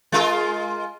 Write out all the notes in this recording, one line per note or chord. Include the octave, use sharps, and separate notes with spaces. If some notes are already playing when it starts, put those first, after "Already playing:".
G#3 F4 A#4